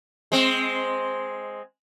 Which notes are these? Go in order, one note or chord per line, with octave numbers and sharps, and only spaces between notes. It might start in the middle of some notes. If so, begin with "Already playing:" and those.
G#3 C4